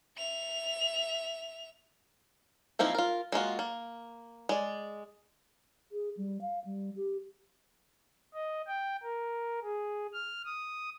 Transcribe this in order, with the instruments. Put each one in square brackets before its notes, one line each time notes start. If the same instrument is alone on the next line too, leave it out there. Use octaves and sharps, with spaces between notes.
[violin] E5 F7
[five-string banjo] F3 A#3 C4 D#4 E4
F4 A#4
G#3 A#3 F4 F#4
A#3
G#3 D5
[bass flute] G#4
G3
F5
G3
G4
[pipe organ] D#5
G5
A#4
G#4
F6
D#6